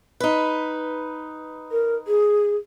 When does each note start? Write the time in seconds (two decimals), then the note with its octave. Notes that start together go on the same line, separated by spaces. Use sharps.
0.20 D#4 B4
1.71 A#4
2.07 G#4